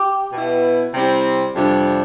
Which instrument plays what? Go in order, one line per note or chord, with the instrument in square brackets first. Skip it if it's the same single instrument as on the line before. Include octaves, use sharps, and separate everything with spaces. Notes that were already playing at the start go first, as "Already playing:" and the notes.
Already playing: [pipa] G4
[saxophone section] B2 B3 E4
C3 G3 C4 E4
F2 C3 G3 D4